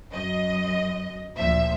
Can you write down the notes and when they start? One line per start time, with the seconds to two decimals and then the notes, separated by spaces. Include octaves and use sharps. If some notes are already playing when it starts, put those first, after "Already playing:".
0.13 F#2 D#5
1.37 D2 A#2 F3 E5